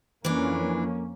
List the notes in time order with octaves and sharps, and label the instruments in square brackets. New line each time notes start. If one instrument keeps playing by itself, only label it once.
[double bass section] F2 A#3 C#4 [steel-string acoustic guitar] E3 D4